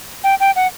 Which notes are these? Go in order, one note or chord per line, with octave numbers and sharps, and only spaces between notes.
G5
G5
F#5